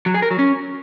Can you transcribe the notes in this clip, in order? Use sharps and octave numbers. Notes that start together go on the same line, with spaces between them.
F#3
G#4
A#4
F#3
C#4